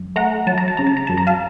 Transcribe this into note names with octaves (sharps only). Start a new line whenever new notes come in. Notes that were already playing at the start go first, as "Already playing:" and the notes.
Already playing: F#2
A3 F#5 A#5
F#3 A5
A#5
A5
C#3 A#5
A5
A#5
F#2 A5
A#5
F5 A5